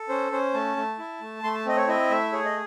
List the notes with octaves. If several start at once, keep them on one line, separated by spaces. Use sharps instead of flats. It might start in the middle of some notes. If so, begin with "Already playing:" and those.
Already playing: A4
C#4 C5
C#4 C5
A3 A5
A3
E4
A3
A3 C6
A5
C4 D#5
C#5
E4 D#5
A3 E5
G#4 C#5
D#5